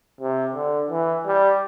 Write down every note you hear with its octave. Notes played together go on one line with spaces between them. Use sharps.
C3
D3
E3
G3